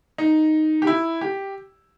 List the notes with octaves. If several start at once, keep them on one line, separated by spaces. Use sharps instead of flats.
D#4
G4
E4
G4